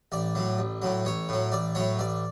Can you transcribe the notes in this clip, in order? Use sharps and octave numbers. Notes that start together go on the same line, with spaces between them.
A1 D5
A2 F#3
A1
A2 F#3
A1 C#5
A2 F#3
A1 D5
A2 F#3 C#5
A1 D5